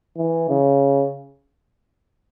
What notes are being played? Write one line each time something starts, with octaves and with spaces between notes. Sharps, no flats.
E3
C#3